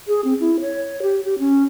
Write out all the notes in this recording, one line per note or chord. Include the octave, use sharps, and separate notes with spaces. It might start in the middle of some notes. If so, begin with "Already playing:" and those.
G#4
C4
E4
C#5
G4
G4
C#4